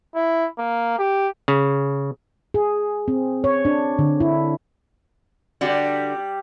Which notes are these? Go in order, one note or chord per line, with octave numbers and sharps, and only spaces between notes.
E4
A#3
G4
C#3
G#4
C4
C#5
D4
D3
E4
D3 G3 D4 F#4